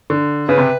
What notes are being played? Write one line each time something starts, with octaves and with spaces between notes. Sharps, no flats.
D3
C#3 B4
C3